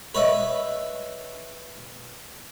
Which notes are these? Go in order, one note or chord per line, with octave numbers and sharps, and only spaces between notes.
B4 C#5 D#5 E5